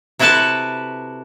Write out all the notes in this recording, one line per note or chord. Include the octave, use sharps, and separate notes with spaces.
C3 E4 F#4 A4 B4 A5